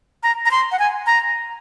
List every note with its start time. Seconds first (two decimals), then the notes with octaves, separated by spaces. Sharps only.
0.23 A#5
0.45 A#5
0.51 C6
0.72 F#5
0.79 G#5
1.06 A#5